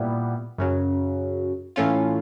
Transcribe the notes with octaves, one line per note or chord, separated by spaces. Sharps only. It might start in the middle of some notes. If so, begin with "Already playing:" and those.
Already playing: A#2 G3 B3 E4
F#2 C#3 F#3
A2 E3 A3 C#4 F4